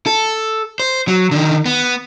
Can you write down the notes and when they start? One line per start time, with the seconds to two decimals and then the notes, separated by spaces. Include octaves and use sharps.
0.06 A4
0.80 C5
1.08 F#3
1.31 D3 D#3
1.66 B3